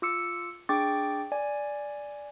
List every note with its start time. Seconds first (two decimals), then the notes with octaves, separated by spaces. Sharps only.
0.02 F4 D6 E6 C#7
0.69 D4 G#4 G5 C#6 D6 A6
1.32 D5 G#5